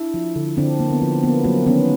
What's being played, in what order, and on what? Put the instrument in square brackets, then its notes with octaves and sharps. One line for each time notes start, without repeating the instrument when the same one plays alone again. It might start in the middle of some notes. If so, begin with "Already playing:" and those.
Already playing: [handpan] D4 E4
F3
D3
D3 C4 D4
A#3
B3
F3
A#3 B3
F#3 A#3 C4
D#3 B3 C#4